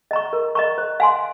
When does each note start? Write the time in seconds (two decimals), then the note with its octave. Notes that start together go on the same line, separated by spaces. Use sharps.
0.11 D#5 A#5 C#6
0.33 A#4
0.55 D#5 A#5 C#6
0.78 C5
1.00 F5 G#5 C6